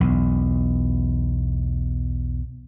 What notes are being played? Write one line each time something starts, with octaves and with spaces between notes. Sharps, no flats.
B1 E2